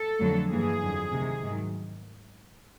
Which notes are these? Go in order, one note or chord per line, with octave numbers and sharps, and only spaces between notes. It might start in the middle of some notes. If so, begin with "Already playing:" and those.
Already playing: A4
F2 D3 F#3 A3
G2 E3 G3 A#3 G#4
F2 D3 F#3
D2 C3 D#3
G#2 D#3 F#3